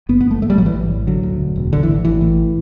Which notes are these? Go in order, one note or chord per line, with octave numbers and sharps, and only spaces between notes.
G1 B3
B3
G1
A3
A1 A3
G3
A2 F#3
E3
A1
A2
D3 F#3
D2
E1
E1
A1 D3
E3
A2
A1 E3
A2